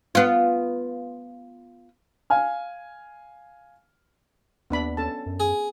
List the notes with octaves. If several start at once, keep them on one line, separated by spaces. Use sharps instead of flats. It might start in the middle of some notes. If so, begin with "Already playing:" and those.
B3 F4
F5 G#5 F6
D#2 B3 D4 B5
C#4 A4 A5
F#2
G#4